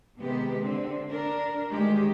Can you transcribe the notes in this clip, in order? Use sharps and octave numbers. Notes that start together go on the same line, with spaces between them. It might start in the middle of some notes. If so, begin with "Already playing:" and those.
C3 D#3 G#3 B3 G4
D3 C4
D4 A#4
D2 D#3 G#3 G4